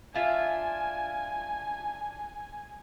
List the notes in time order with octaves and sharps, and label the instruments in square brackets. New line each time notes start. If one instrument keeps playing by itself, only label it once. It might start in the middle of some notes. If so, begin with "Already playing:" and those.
[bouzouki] D4 F4 E5 [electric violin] G#5